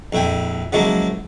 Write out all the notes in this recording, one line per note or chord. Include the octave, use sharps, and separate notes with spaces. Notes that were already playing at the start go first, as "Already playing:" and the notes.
A#1 F2 E4 G5 G#5
C#3 F3 F#3 G#3 A#3 E4